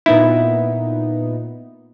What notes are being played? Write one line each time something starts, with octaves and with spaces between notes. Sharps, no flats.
A#2 B3 D#4 E4